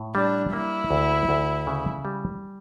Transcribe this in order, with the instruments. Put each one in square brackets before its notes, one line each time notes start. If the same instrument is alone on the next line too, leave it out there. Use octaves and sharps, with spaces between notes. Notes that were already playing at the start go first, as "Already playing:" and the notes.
Already playing: [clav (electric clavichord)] A2
[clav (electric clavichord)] G3 [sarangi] D4
[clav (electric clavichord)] A#3 [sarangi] E4
[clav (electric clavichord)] D2
D2
C#3
G3